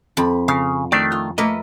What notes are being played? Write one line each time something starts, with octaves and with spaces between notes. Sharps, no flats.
F2 B5
C#3 F5
D#3 A3 D4 D5
F4
A3 A#3 A#4 B4 D#5